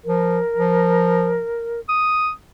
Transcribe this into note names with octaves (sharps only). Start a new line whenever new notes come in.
F3 A#4
F3
D#6